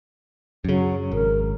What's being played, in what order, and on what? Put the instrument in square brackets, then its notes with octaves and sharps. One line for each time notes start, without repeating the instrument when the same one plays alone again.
[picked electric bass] F#2 C#3 [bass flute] F#3
[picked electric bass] G#1 [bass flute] A#4